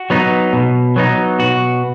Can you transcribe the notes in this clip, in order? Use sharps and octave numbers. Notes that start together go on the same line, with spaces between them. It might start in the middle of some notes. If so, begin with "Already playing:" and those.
Already playing: F#4
F#3 B3 D#4
B2
F#3 B3 D#4
B2 F#4